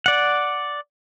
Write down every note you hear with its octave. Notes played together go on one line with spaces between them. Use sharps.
D5 F#5